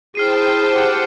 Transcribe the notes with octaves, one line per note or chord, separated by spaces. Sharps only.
E4 G#4 C5 G5 A5 F6 C7 D#7
G4 F#5